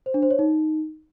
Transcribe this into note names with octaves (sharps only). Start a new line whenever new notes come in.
C5
D4
C5
C#5
D#4